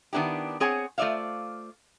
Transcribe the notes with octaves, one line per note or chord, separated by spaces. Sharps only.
D#3 B3 D4 E4 G4
C4 G#4 C#5 F#5 G#5
A3 F4 C5 D5 E5 F5